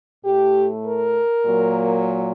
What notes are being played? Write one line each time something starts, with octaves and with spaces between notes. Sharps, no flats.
A2 A3 G4
A#4
A#2 F#3 A#3